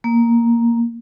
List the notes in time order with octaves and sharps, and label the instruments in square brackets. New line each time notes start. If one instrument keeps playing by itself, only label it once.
[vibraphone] A#3